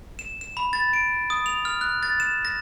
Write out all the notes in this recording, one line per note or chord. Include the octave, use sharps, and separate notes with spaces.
E7
E7
B5
A6
D7
D#6
F7
F6
F#6
A6
E7
A#6